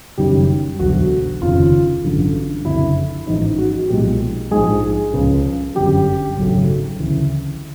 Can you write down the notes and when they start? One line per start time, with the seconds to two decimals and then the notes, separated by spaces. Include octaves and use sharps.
0.18 F#1 F#2 D#3 G3 G4
0.79 E1 D2 D3 F#3 F#4
1.41 F1 D#2 C#3 F4
2.03 A1 G2 D3 F#3
2.65 F#1 F2 D3 E4
3.27 A1 G#2 F3 G#3 D#4
3.58 F#4
3.89 B1 A#2 F3 G#3 G4
4.51 A#1 G#2 F3 G#3 G#4
5.13 C#2 C#3 F3
5.75 G1 F#2 D3 G3 G4
6.37 G#1 F#2 C#3 F#3 A3
6.99 D2 C#3 E3